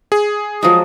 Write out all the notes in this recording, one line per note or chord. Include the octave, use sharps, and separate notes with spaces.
G#4
F3 F#3 G#3 D#6